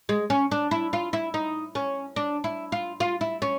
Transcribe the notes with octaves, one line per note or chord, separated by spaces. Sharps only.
G#3
C#4
D4
E4
F4
E4
D#4
C#4
D4
E4
F4
F4
E4
C#4